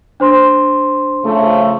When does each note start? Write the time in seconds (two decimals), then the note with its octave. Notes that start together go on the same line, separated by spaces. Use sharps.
0.20 D4 C5 C6
1.24 C#3 F3 A3